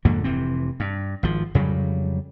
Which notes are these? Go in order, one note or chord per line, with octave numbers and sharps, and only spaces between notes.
F2 G#2 D3 A#3
F1 C3 E3 C4
G2
G#1 F3
F2 C#3 F#3 G3